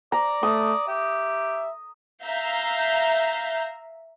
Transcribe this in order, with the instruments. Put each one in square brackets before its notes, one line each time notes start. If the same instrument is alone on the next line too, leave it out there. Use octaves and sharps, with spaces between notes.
[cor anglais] D5 [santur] A#5
[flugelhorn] A3 [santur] D#6
[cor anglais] G4 [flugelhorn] E5
[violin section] E5 F5 A#5 G6